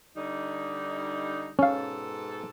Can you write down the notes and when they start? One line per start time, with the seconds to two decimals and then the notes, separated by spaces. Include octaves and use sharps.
0.16 D3 G3 D#4
1.59 G#2 B2 C#4 A4 F5